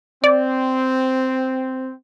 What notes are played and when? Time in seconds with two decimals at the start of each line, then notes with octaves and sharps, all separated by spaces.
0.24 C4 D5